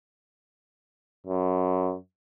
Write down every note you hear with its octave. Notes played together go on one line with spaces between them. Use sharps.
F#2